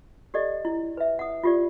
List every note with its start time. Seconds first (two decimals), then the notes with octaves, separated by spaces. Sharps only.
0.34 G4 A4 D5 D#5
0.65 E4
0.97 B4 E5
1.19 F#5 D#6
1.44 F4 G4 D5